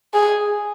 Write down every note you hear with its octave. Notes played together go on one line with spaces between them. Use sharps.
G#4